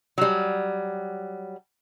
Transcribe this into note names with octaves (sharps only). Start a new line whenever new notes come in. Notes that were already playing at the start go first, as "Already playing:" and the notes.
F#3 G3